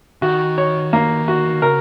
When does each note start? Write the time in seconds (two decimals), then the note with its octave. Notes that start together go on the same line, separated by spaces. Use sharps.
0.22 D#3 F#4
0.58 C#5
0.93 A#3
1.28 F#4
1.62 C#3 A#4